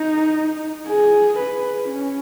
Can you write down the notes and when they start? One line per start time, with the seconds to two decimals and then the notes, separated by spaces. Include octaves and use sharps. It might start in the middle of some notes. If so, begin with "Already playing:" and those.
Already playing: D#4
0.88 G#4
1.38 B4
1.89 C#4